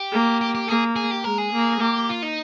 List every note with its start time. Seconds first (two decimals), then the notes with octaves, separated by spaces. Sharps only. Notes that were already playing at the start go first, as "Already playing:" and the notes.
Already playing: G4
0.13 A#3
0.41 G4
0.55 G4
0.68 A#3 G#4
0.96 G#4
1.11 G4
1.24 G#3 A#4
1.38 G#4
1.53 A#3
1.81 A#3 G4
2.09 F4
2.22 D#4